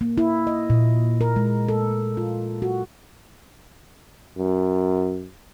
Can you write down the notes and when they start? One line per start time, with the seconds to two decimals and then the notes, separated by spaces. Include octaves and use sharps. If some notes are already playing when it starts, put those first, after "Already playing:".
0.01 A#3
0.18 E4
0.47 D#5
0.70 A#2
1.21 A#4
1.36 G#3
1.68 A4
2.17 F4
2.62 F#4
4.37 F#2